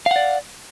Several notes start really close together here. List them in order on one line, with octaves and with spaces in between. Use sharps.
F5 F#5 D5